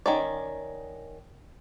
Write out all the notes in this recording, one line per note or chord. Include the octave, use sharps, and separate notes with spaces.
D#3 C#4 D5